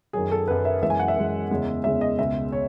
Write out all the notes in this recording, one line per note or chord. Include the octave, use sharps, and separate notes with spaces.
F#2 D#3 F#3 G#4
A4
F#2 D#3 F#3 B4
E5
F#2 E3 G#3 E5
G#5
F#5
E5
F#2 E3 G#3
E2 C#3 G#3
E2 C#3 G#3 E5
D#5
C#2 B2 G#3 E5
C#5